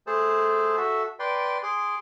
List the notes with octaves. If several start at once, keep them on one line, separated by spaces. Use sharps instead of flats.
A3 G#4 A4 C5 A5
F#4 A4 E5
B4 D5 G5 C6
G#4 C6 D6